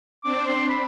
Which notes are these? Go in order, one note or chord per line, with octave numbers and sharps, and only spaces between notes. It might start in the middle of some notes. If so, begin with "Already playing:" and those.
C4 D4 D6
C6
B5